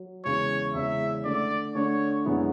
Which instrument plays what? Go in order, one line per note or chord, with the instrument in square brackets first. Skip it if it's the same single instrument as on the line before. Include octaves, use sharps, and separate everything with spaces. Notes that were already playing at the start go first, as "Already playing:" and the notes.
Already playing: [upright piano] F#3
[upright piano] E2 C#3 E3 G#3 C#4 [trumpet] C#5
[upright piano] E2 C#3 E3 G#3 C#4 [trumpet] E5
[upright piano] D3 A3 D4 [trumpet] D5
[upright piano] D3 A3 D4 [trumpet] C#5
[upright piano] F#2 D3 G#3 B3 E4